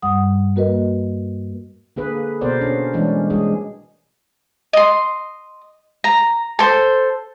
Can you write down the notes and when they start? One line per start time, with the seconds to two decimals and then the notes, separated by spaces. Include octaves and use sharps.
0.02 G2 G3 F#5 D#6
0.56 A#3 F#4 A#4 B4 D#5
1.96 D3 A#3 G#4 B4
2.41 B2 B3 A#4 C5 D5
2.61 C#4 D4
2.93 E3 G3 G#3 C#4 D4
3.30 G3 G#3 D4 G#4
4.73 D#5 C6
6.04 A#5
6.59 A4 C5